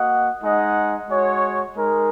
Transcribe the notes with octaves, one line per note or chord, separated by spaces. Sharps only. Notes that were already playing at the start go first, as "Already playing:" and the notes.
Already playing: A#3 F#4 D#5 F#5
G#3 D#4 G#4 D#5 F#5
G#3 F#4 C#5
G#3 D#4 A#4